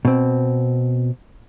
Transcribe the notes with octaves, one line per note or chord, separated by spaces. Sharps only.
B2 C4